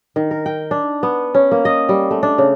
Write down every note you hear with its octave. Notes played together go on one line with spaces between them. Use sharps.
D#3
A#4
G5
D4
B3
C#4
A#3
D#5
G3
A3
D4
C#3